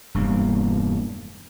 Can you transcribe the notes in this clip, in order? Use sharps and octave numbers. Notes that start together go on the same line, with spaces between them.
E1 G2 A#3